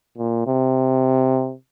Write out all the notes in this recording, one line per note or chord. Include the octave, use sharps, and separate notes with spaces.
A#2
C3